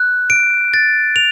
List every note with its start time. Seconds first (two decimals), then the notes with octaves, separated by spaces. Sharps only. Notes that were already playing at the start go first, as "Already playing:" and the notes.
Already playing: F#6
0.30 D7
0.74 A6
1.16 F7